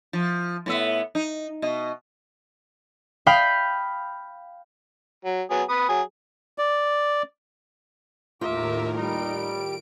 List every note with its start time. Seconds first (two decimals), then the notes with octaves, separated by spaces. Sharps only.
0.13 F3
0.66 A2 B3 E5
1.15 D#4
1.62 B2 D#5
3.26 F5 G5 B5 D#6 B6
5.25 F#3
5.51 F#3 B3 G#4
5.69 B4 D#6
5.89 F#3 G#4
6.58 D5
8.41 D#2 A2 F4 A#4 E5 D6
8.96 G3 D#4 D7